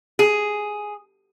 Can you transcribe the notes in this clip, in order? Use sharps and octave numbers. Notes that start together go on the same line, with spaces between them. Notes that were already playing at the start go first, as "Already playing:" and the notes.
G#4